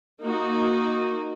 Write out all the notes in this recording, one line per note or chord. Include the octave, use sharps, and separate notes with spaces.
A#3 D#4 F#4